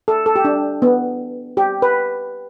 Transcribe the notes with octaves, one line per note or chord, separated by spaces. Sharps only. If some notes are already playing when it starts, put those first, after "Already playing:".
A4
A4
G4
D4
B3
G4
B4